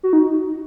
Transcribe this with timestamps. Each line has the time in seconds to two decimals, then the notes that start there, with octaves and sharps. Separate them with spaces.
0.03 F#4
0.13 D#4